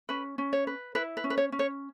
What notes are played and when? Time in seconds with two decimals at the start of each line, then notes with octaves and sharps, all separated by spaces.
0.09 C#4 B4
0.38 C#4
0.53 C#5
0.67 B4
0.95 E4 B4
1.17 B4
1.24 C#4
1.30 B4
1.38 C#5
1.52 C#4
1.59 C#5